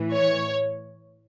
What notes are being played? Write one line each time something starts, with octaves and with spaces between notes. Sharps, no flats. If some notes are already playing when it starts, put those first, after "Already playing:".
Already playing: A2 E3
C#5